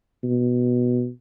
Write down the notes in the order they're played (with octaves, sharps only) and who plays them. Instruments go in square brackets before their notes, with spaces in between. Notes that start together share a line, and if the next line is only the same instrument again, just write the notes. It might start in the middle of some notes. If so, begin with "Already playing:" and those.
[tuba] B2